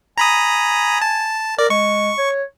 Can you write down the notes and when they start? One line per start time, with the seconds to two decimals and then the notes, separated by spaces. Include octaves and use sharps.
0.18 G#5 A#5 B5 D#6
1.01 A5
1.58 A#4 D5
1.70 G#3 C#6
2.18 C#5